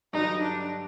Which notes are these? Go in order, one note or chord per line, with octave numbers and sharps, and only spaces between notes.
G2 D3 F#3 D#4
D4